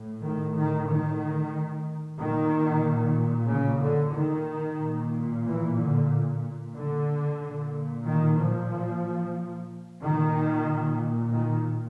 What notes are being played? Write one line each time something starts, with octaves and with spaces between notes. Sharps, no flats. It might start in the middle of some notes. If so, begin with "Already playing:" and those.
Already playing: A2
D#3
D#3
D#3
A#2 D#3
C#3
D3
D#3
A#2
E3
D3
D3
A#2
D#3
F3
A#2 D#3
D#3